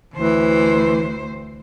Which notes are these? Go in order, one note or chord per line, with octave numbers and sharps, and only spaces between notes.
D2 E3 C5